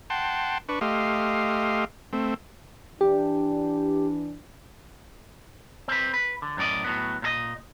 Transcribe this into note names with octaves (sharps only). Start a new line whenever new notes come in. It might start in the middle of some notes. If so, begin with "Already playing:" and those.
F#5 G5 A5 C6
D4 B4 C#6
A3 G4 D#5 F5 C6
A3 C4
E3 D4 G4
C4 B4
B4
D3
F#2 A2 D5 D#5
A2 F#3 B3
A#2 A4 D#5